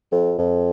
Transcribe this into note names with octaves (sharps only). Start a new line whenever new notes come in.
F2
F2